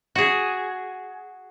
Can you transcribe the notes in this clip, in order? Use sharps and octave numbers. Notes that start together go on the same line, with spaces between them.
F#4 G#4